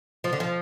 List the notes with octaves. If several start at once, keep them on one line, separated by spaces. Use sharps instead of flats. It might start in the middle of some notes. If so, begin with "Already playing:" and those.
F3
D3
F3